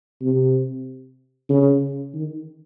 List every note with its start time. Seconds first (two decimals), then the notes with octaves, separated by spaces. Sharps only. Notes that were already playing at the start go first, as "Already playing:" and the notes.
0.22 C3
1.50 C#3
2.14 D#3